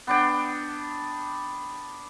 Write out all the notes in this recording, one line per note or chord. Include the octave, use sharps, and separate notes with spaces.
B3 D4 G5